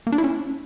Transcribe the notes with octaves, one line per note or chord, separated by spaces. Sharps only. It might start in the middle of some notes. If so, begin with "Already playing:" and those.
A#3
D4
E4
C#4